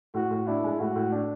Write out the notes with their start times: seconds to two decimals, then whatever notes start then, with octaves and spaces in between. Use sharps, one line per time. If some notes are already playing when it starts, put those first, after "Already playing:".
0.14 A2 F#4
0.31 A2
0.47 D4 E4
0.64 G#3
0.80 A2 F#4
0.96 A2
1.12 D4